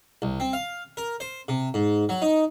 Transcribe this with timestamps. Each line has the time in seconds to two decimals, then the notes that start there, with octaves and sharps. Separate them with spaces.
0.22 C2
0.40 C4
0.53 F5
0.97 A#4
1.20 C5
1.48 C3
1.74 G#2
2.09 F#3
2.22 D#4